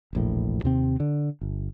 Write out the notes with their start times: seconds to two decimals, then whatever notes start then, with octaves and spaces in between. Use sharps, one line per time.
0.13 E1 A#1 A2
0.64 D#2 C3 C4
1.00 D3
1.41 G1